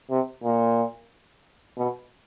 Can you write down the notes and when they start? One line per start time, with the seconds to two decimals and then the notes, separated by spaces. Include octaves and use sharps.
0.10 C3
0.44 A#2
1.78 B2